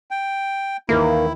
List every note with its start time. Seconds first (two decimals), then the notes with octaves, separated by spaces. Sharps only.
0.11 G5
0.89 D#2 D#3 E3 A#3 E4